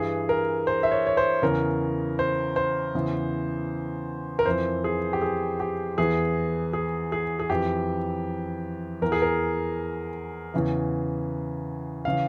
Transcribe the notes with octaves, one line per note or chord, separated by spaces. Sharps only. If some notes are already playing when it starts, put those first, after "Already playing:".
Already playing: G2 E3 G#4
A#4
C5
E5
C#5
C#5
C5
E2 C#3 E3 A#4
C5
C5
E2 C#3 E3
A#4
F2 E3 C5
G#4
G4
G#4
G4
E2 E3 G#4
G#4
G#4
G#4
F2 E3 G4
E2 E3 A#4
G#4
A#4
E2 C#3 E3
C#3 E3 F5